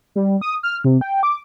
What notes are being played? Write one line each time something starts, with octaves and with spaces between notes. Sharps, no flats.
G3
D#6
F6
C3
G5
D6